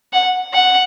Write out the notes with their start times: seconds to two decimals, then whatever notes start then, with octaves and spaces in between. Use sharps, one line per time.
0.13 F#5
0.53 F#5